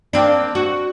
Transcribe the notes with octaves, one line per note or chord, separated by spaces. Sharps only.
A#3 C4 D4
F#4